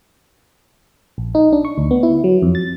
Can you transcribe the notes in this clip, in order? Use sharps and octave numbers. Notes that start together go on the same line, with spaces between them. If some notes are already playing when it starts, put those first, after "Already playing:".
A#1
D#4
D4
C#6
D2
B3
E4
F#3
F2
A6